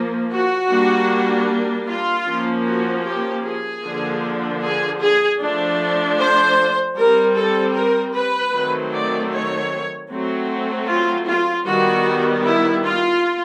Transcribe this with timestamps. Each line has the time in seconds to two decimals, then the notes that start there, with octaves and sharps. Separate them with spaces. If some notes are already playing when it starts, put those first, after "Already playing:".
Already playing: F3 A#3
0.31 F#4
0.70 G3 A#3 D4
1.88 F4
2.26 F3 A#3 C#4
2.65 F#4
3.04 G4
3.44 G#4
3.83 D3 F3 A#3 D4
4.62 G#4
5.00 G#4
5.40 F3 A3 D4
6.18 C5
6.96 G3 C4 A#4
7.36 A4
7.75 A#4
8.13 B4
8.52 D#3 F#3 A3 C4
8.93 D5
9.31 C#5
10.10 F#3 A3 C4
10.88 F4
11.27 F4
11.66 D#3 G3 B3 F#4
12.45 E4
12.84 F4